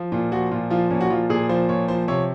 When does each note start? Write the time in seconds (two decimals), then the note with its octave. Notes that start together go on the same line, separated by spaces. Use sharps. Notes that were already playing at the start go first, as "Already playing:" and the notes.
Already playing: F3
0.12 A#2 F4
0.32 F3 F#4
0.51 A#2 F4
0.70 F3 F4
0.91 A#2 C#4
1.01 F#4
1.10 F3 F4
1.30 A#2 G#4
1.49 F3 C5
1.69 A#2 C#5
1.88 F3 C5
2.08 C3 C#5